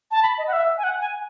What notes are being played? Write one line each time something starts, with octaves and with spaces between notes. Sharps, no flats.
A5
B5
D#5
F#5
E5
G#5
F#5
G#5